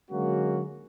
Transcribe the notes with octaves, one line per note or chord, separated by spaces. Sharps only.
D3 F#3 G#3 A#3 C#4 F#4